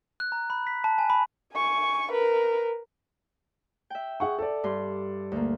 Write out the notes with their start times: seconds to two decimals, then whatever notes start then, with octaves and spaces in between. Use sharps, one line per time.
0.20 F#6
0.32 A#5
0.50 B5
0.67 B6
0.84 A5
0.98 G#5
1.10 B5
1.54 G#5 C#6
2.12 A#4 B4
3.90 E5 G5
4.20 G#4 F#5 C#6
4.39 A4 D5
4.64 G2 C6
5.32 D2 A#3